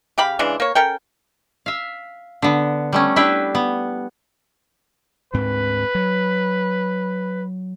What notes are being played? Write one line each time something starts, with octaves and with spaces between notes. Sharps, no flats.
C#3 G4 F5 B5
C#3 E3 G#3 D4
A#3 C#5
C#4 A4 A#4 G5
E5 F5
D3 B3
G3 A3 C#4
D4 E4 G4 B4 E5
B3
D2 G#2 C4 B4
F#3